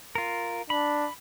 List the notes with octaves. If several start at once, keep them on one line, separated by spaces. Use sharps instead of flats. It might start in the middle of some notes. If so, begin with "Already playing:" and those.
F4 A#4
D4 B5